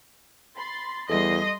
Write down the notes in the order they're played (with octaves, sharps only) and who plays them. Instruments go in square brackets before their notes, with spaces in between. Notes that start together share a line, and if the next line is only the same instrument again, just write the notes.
[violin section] B5 C6 A6
[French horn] E2 [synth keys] G3 A4 [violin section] A3 C6 D#6 [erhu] D#5